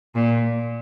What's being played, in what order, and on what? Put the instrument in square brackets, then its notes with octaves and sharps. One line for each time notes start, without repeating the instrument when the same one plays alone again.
[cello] A#2